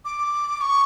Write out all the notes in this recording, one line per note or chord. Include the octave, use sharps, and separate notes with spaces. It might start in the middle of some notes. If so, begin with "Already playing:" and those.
D6
C#6